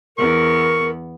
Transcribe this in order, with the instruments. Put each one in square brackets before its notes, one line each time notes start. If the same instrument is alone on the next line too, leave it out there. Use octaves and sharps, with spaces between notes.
[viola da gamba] E2 B3 [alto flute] A#4 [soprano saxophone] C#6